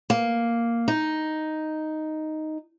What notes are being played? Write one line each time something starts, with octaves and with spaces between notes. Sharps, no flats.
A#3
D#4